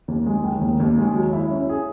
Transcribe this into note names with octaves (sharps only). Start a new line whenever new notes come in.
D#2
G#3
D#3
D#2
D#2
G#3
F#3
E4
C#4
G#4